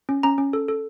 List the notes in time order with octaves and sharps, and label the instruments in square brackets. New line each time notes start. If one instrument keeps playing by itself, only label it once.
[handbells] C#4
C#4 A#5
C#4
A4
A4